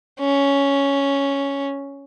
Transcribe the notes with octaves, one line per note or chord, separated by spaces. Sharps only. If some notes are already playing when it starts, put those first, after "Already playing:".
C#4